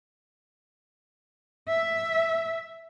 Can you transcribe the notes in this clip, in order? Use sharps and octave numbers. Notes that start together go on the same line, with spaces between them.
E5